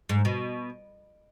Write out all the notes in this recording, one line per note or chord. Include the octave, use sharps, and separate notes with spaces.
G#2
B2